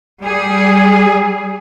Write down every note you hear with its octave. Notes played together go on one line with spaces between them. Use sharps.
G3 G#4